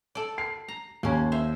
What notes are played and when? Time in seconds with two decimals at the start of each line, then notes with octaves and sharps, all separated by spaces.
0.15 A4 D5
0.38 C7
0.68 A#5
1.03 D#2 A#3 C#4
1.32 C5 E5